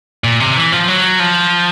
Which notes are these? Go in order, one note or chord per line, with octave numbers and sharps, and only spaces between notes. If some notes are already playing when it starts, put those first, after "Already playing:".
A#2
C3
E3
F3
F#3
F3